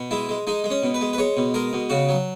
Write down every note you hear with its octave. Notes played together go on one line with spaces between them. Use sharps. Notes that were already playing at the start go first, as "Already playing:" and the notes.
Already playing: B2
G#3 E4
G#3
G#3 D#4
G#3
C#4
B2
B4
G#3
B4
G#3 C#5
B2
G#3 A#4
B2
C#3 F#4
F#3